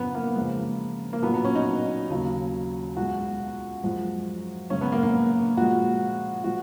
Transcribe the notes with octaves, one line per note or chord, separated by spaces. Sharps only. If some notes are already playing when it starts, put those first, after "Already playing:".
Already playing: F#2 C#3 F3 B3
A#3
F2 C#3 G#3
A#3
A#2 F#3 B3
B3
C#4
D#4
D#2 C#3 F#3
C#2 B2 G#3 F#4
F#2 F3 G#3
F#2 C#3 G#3 C#4
B3
A#3
A#3
A#2 F3 G#3 F#4
F3 G#3 F#4